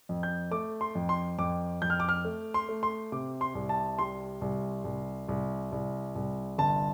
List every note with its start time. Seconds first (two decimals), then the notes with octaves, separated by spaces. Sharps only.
0.09 F2
0.23 G6
0.51 A3 D6
0.81 C6
0.95 F2
1.09 C6
1.38 F2 D6
1.82 F2 G6
1.90 F6
2.00 D6
2.09 F6
2.25 A3
2.54 C6
2.69 A3
2.83 C6
3.12 C3 D6
3.41 C6
3.55 C2
3.69 A5
3.99 G3 C6
4.41 C2
4.85 C2
5.28 C2
5.72 C2
6.15 C2
6.58 G1 A5